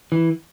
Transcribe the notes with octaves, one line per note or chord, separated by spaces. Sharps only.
E3